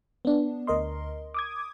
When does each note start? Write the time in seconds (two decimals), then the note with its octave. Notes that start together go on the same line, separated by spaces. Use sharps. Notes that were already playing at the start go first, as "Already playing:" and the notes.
0.25 B3 D4
0.67 D2 A#4 D#5 C6
1.34 D6 D#6 G#6